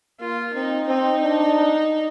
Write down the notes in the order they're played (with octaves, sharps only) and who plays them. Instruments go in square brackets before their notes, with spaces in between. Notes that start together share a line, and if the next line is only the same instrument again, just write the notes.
[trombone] A#3 [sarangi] F4
[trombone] C4 [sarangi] D#4
[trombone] C4 [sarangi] D#4
[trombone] D4